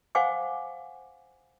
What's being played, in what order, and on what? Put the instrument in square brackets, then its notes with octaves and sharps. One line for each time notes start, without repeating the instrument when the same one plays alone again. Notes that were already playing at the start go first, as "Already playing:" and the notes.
[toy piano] C5 F5 F#5 G#5 C#6 D6